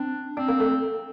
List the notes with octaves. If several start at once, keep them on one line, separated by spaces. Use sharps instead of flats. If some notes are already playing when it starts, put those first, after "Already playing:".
Already playing: C4 D4
C4 D4
A#3
A3